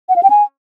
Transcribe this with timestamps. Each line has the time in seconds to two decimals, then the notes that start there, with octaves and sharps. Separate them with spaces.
0.09 F#5
0.16 F5
0.23 G5
0.30 G#5